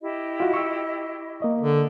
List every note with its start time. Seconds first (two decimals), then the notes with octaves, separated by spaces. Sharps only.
0.02 E4 G4 D#5
0.40 F4 F#4
0.54 C#6 E6
1.42 A#3 D#5
1.61 D3